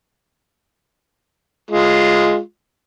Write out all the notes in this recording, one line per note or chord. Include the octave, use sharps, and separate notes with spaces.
G#3 F4